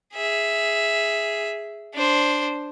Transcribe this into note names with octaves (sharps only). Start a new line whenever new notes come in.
G#4 E5
D4 C5